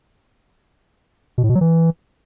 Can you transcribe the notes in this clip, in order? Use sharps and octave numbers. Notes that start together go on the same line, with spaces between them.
B2
A2
B2
F#3
E3